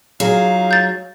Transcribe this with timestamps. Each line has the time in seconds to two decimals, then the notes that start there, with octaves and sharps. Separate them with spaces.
0.20 F#3 D#4 F4 G#4 F5
0.71 G6 A6